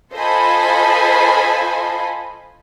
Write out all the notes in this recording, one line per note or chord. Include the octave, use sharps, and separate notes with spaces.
F4 A4 C5 D#5 G#5 B5